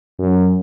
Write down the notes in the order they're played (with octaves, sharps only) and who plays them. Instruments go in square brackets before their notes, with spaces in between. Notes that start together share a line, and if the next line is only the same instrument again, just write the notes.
[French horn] F#2